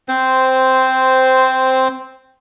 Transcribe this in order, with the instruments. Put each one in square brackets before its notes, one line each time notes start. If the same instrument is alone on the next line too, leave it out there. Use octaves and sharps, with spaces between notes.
[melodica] C4 C5